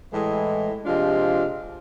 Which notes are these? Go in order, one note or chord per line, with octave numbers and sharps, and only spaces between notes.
A2 E3 G#3
C3 F3 G#3 D4 F4